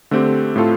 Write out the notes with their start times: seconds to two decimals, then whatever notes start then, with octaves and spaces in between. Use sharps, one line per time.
0.11 D3 A3 C4 G4
0.56 A2 A3 C4 F4 A4